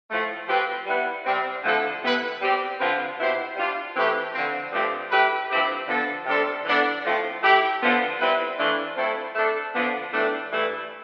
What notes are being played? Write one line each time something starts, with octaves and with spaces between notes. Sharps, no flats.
A2 F3 A3
F3 C4 G4 B4
G3 B3 E4 B4
C3 G3 C4
D3 F3 A3 E4 A4
C3 E3 B3 E4 B4
G3 C4 G4
D3 F3 C4 F4 B4
B2 B3 E4 G4 C5
G3 D4 F4
E3 A3 C4 G4 B4
D3 F3 C4
G2 F3 A3 C4 G4
A3 E4 G4 B4
G2 F3 C4 E4 G4
D3 F3 B3 D4 A4
C3 G3 D4 A4 C5
E3 B3 D4 A4
A2 F3 A3 C4
A3 E4 G4
D3 F3 B3 F4 A4
G3 C4 E4 B4
E3 A3 D4 F4
F3 A3 C4 E4 A4
A3 D4 A4
D3 F3 B3 D4
A2 E3 A3 D4
G2 E3 A3 E4